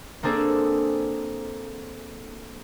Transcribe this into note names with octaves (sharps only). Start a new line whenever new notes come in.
A#3 C4 D4 G#4 A4